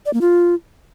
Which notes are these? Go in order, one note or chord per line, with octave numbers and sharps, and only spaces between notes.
D5
A#3
F4